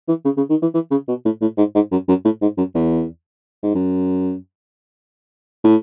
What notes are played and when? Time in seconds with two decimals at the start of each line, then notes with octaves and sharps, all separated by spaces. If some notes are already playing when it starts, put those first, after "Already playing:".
0.08 E3
0.25 C#3
0.37 C#3
0.50 D#3
0.62 E3
0.74 E3
0.91 C#3
1.08 B2
1.25 A2
1.42 A2
1.58 G#2
1.75 G#2
1.92 F#2
2.08 F#2
2.25 A2
2.42 G#2
2.58 F#2
2.75 E2
3.63 G#2
3.75 F#2
5.64 A2